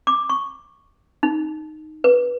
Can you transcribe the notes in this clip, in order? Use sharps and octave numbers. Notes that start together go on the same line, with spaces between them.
D6
C#6
D#4
B4